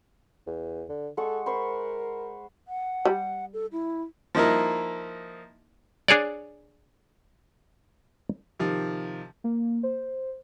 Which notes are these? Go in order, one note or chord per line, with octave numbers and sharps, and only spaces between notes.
E2
D3
G#3 A4 F#5 C#6
A#4 C5 B5 C#6
F#5
G3
A4
E4
F3 A#3 D#4 E4 A#4
D4 G#4 C#5 D5
C3 D#3 F3
A#3
C5